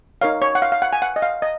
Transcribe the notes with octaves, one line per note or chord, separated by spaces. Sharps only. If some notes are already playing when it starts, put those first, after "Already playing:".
D#4 A#4 C#5 F5
C#5
F#5
F5
F5
F#5
G#5
F#5
D#5
F5
D#5